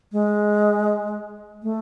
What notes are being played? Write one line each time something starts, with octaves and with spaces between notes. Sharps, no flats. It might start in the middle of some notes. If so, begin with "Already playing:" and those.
G#3
A3